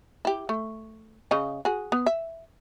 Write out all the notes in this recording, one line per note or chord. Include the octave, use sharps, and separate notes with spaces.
E4 G4
A3
C#3 D#5
F#4 G#4
B3
E5